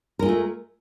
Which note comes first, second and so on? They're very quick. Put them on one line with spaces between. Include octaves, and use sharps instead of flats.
A#4 G#3 F4 A3